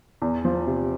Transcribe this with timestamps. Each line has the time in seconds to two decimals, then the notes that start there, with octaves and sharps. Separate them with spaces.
0.22 E2
0.45 F3
0.67 C3